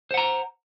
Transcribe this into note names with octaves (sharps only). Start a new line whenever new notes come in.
C5 F#5 A#5